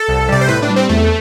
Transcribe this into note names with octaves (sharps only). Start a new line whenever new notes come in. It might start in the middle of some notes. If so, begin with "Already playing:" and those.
Already playing: A4
C2
C3 G3 D5
C5
A2 B4
D4
G3
C4
E2 A3